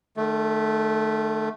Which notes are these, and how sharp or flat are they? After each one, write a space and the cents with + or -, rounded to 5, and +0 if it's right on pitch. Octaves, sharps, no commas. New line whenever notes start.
D#3 -45 A3 -10